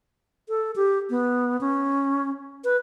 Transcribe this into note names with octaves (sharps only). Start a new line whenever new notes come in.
A4
G4
B3
C#4
B4